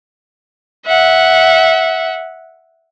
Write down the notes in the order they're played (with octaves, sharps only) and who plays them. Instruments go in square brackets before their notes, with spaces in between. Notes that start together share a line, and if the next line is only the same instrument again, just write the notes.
[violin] E5 F#5